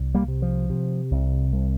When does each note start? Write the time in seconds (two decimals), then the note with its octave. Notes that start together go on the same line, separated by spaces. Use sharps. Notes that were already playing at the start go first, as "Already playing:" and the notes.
Already playing: C2
0.15 G3 A#3
0.28 C3
0.42 F3
0.70 C3
1.11 C2
1.53 C2